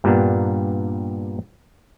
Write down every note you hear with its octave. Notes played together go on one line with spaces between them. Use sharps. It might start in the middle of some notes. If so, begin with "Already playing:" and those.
G2 A#2 G3 A#3 B3 D4